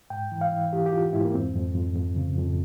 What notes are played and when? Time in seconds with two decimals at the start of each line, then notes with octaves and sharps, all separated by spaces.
0.10 G#2 G5
0.32 E3
0.41 F5
0.53 E3
0.73 E3 G4
0.86 G4
0.93 E3 F4
1.13 G#2 E4
1.25 A#3
1.34 F2 C4
1.55 F2
1.75 F2
1.96 F2
2.16 C#3
2.38 F2